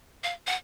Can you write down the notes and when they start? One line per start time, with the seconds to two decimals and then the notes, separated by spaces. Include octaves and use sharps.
0.24 F5
0.47 F#5